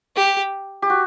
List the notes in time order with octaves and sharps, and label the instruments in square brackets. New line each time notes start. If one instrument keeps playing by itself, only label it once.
[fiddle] G4
[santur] G4
F#4